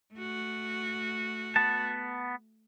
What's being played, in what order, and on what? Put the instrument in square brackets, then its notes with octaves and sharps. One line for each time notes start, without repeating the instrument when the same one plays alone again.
[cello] A3 F#4
[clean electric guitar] B3 A5